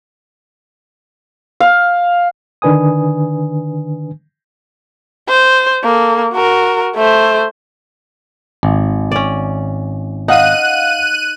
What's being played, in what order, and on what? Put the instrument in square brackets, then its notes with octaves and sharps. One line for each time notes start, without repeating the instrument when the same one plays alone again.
[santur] F5
[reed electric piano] D3 D#3 D4 B4 G#5 D#6
[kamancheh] C5
A#3 A4
F#4 A#4
A3 C5
[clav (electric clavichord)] G#1
[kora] C#4 D5
[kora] D#4 [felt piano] F5 F#5 [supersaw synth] F#6 D#7